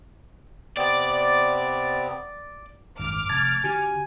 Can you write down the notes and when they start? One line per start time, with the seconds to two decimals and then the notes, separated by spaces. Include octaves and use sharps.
0.77 C3 B3 C4 D5
2.99 G#1 F#2 D6 F6
3.29 F1 A5 G#6 A6
3.64 D3 F#4 G4 G#5